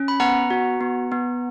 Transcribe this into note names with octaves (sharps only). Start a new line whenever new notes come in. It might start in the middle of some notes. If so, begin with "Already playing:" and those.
Already playing: C#4
B5
B3 F#5 A#5
F#4
B3
B3